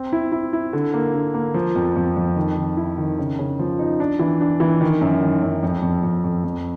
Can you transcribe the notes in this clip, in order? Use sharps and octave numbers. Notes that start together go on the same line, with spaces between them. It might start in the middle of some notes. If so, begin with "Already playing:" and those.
Already playing: C4
E4
E4
E4
D3
A#3
D3
A#3
F3
F2
F2
F2
D#3
D#3
E4
D#3
C#3
C#3
F3
D#4
D4
E3
D4
E3
D#3
F#2
D#3
F#2
F2
F2
F2
F2
F2